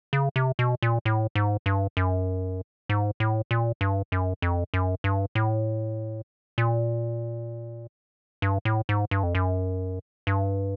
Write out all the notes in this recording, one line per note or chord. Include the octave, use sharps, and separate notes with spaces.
C#3
C3
B2
A#2
A2
G#2
G2
F#2
G#2
A2
A#2
G2
F#2
F2
F#2
G2
A2
A#2
G2
A2
G#2
G2
F2
F#2
G2